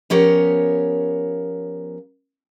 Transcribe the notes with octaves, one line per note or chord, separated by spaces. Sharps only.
F3 B3 C#4 G4 A#4 C#5